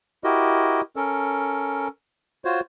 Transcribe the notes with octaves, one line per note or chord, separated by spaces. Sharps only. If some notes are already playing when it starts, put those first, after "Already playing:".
E4 F#4 G4 A#4 D#5
C#4 A4 A#4
F4 F#4 C5 C#5